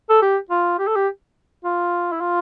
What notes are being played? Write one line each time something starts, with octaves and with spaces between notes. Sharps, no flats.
A4
G4
F4
G4
A4
G4
F4
E4
F4